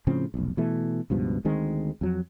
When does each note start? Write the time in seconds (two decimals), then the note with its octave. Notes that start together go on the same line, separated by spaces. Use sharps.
0.07 A2 C#3 F3 C4
0.34 F1 B1
0.57 B2 E3 A3
1.10 C#2 G2 B2 F3
1.45 D2 D#3 G#3 C4
2.01 F2 F#3